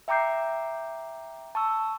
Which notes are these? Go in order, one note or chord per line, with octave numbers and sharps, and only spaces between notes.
E5 G5 A#5 D6 G6 C7
A5 C#6 E6